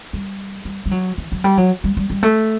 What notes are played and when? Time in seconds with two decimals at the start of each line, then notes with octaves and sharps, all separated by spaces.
0.13 G3
0.65 G3
0.86 G3
0.91 F#3
1.18 E3
1.32 F#3
1.44 G3
1.57 F#3
1.84 G3
1.97 G3
2.10 G3
2.23 A3